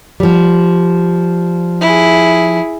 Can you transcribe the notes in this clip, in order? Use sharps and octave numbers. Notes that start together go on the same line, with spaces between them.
F3 G3
E4 G#4